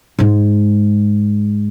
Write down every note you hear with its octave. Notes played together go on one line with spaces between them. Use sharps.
G#2 G#3